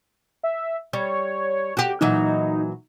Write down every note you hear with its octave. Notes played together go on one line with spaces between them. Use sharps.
E5
G3 C#5
F#4 G4
A#2 E3 F#3 D#4